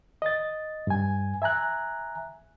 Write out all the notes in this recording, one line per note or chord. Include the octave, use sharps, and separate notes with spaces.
D#5 A6
G2 G#5
E5 G#5 A#5 F#6